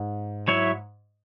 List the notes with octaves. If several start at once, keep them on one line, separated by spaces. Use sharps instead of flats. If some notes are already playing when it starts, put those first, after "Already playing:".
Already playing: G#2
F#3 E4 C#5 E5